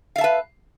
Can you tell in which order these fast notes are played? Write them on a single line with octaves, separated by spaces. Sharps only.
F5 E5 A5 B4